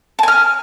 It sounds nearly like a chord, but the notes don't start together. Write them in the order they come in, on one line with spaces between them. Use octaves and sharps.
A5 G#5 F6